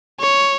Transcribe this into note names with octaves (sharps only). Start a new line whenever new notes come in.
C#5